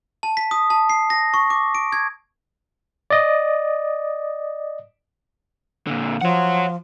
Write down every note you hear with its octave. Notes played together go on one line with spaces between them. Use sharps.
A5
B6
D#6
A5
C7
A#6
C#6
D6
D7
G#6
D5 D#5
A#2 D3
F3 C#5 F#5